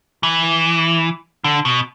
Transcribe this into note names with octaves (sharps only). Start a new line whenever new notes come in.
E3
D3
B2